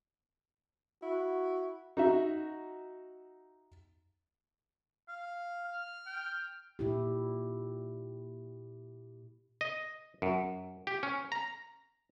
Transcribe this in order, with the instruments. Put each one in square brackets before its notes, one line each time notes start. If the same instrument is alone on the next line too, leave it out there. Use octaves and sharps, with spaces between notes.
[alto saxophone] E4 [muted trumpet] F#4
[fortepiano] D#4 F#4 E5
[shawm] F5
[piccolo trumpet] F6
[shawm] G5
[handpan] A#2 E4 G4
[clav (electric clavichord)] D#5
F#2
G4
C#4
A#5